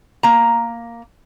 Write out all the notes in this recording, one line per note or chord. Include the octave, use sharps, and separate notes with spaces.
A#3 A#5